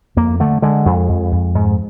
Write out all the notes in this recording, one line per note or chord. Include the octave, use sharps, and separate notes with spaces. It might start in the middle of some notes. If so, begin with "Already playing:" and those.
F2 A#3
D3 A3
D3 G#3
F2
F2
F2
G#2